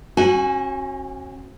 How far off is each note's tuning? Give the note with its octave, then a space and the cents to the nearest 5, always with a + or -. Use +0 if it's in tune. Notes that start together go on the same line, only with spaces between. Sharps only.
C#4 -40 F#4 +0 G#5 +0